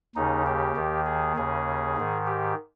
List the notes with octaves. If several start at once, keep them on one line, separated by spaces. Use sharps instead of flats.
D#2 C#3 D#4
G4
D#2 D#3
G#4
D#2 C#3 G#4
G#2 D#3
G4